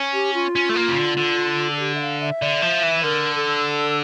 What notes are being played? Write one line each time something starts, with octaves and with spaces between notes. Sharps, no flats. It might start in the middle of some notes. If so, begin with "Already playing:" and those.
Already playing: C#4
G4
F4
C#4
A3
A#3
C#3
D3
D3
A4
G4
E5
F5
E5
D3
F3
E3
D3 A#4
A4